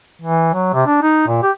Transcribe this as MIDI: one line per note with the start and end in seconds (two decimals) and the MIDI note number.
0.22 0.51 52
0.54 0.70 54
0.74 0.84 48
0.86 0.99 62
1.02 1.26 63
1.28 1.40 46
1.43 1.51 67